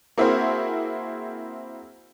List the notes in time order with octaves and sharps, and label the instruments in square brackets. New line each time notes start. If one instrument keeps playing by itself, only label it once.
[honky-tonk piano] A#3 C4 E4 F#4 G#4 C5